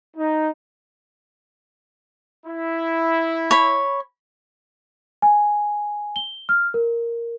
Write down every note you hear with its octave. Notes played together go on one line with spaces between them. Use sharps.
D#4
E4
C#5 B5
G#5
G7
F6
A#4